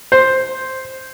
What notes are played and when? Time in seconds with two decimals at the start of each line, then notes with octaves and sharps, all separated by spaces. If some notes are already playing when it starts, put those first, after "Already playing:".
0.12 C5